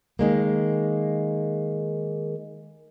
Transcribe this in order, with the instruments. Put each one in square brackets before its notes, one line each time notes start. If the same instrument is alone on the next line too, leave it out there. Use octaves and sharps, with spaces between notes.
[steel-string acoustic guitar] D#3 G#3 A#3